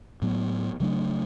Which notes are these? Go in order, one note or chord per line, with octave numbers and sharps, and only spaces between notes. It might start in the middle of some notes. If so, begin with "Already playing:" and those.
A2 F#3 B3
C#3 F#3 A3 D4